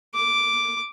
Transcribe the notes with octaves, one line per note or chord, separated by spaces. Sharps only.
D6